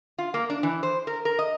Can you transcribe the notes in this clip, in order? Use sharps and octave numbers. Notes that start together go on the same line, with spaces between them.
F4
A#3
D4
E3
C5
A#4
A#4
D#5